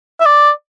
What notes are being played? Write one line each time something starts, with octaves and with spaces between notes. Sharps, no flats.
E5
D5